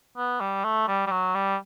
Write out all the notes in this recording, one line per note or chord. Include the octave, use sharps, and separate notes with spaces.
B3
G3
A3
G3
G3
F#3
G3